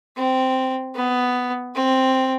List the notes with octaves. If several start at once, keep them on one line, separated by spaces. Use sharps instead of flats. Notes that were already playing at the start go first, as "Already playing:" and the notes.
C4
B3
C4